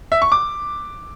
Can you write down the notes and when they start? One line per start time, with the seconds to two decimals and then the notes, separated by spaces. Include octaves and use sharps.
0.12 E5
0.22 C#6
0.32 D6